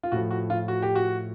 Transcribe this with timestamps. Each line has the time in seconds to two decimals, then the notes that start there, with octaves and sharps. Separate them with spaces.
0.03 F4
0.12 A2 F3 F#4
0.31 F#4
0.50 F4
0.68 F#4
0.82 G4
0.95 F#4